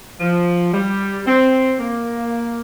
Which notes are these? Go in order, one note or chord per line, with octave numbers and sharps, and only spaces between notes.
F3
G3
C4
A#3